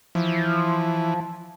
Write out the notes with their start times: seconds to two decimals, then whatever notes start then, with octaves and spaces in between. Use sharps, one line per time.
0.15 E3 F3